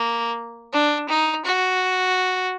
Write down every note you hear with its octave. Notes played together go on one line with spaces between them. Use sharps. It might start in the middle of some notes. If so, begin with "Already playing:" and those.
Already playing: A#3
D4
D#4
F#4